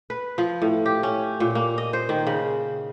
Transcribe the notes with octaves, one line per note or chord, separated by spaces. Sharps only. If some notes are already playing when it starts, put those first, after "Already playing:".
B4
F3
A2
G4
C#4
A#2
A#3
D#5
C5
D#3
C#3